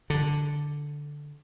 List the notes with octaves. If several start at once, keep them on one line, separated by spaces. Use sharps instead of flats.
D3